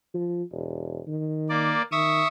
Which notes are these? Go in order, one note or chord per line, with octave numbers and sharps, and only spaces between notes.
F3
E1
D#3
A#3 D5
D#3 E5 C#6 D#6